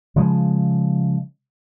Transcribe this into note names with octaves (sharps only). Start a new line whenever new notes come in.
C#3 F3 G#3